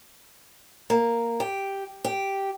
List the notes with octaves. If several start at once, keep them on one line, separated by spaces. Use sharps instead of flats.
A#3
G4
G4